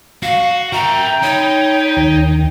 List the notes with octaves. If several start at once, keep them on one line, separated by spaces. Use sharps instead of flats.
F#4 F5
A#4 E5 G5 A#5
D#4 C#5 B5
D#2 D#3